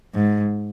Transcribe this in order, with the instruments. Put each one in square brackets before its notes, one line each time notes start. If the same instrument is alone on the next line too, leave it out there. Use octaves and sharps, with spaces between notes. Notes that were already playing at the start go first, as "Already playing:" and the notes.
[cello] G#2